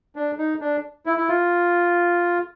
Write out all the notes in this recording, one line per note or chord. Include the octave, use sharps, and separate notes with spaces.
D4
D#4
D4
E4
E4
F4